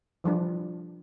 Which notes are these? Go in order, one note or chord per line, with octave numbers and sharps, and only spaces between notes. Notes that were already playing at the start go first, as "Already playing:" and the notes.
E3 F3 G3 D4